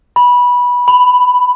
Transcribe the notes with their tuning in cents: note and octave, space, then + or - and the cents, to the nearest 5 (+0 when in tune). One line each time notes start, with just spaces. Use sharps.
B5 -15
B5 +10